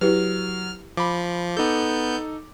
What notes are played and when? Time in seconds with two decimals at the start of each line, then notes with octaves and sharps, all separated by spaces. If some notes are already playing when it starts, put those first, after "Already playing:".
0.01 F#3 E4 G4 B4 F6
0.97 F3 B5 D6
1.57 B3 D#4 A4 G6